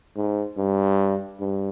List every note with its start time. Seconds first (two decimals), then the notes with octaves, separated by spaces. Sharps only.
0.16 G#2
0.58 G2
1.41 G2